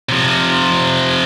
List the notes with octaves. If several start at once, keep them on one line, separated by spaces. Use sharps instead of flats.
C3 F3